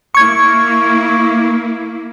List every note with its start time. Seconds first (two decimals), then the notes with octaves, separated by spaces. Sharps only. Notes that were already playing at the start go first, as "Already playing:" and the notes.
0.15 A#3 E4 C#6 G#6